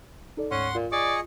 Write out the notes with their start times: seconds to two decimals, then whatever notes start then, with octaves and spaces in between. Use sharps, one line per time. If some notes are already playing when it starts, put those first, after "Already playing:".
0.37 D#4 A4 D5
0.51 D2 G#2 C#4 F#5 C6
0.75 A#2 F4
0.92 G#4 D5 D#5 C#6